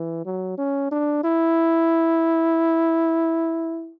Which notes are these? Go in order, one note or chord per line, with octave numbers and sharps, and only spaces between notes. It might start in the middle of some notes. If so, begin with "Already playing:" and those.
Already playing: E3
F#3
C#4
D4
E4